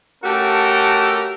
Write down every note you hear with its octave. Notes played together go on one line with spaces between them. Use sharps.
A3 C#4 F#4 G4 A4 A#4